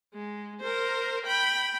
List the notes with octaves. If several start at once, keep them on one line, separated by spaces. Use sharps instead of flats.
G#3
A#4 C5
G5 B5